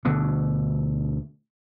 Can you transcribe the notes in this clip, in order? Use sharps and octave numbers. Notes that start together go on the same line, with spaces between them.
D2 B2 D3